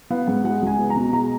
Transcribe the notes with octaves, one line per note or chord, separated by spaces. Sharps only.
B3 F5
G#2 F#5
G#3 F#5
C#2 G#5
B3
A#5
B2
G#3 A#5